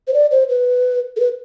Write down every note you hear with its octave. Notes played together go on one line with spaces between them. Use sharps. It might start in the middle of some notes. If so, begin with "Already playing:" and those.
C5
D5
C5
B4
A4
B4